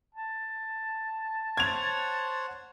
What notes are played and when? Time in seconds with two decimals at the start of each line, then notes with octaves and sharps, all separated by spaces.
0.15 A5
1.57 C5 C#5 F#5 G#6 F7